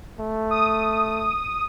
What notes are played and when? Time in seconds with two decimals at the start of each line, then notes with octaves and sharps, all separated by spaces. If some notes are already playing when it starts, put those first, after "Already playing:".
0.20 A3
0.51 D#6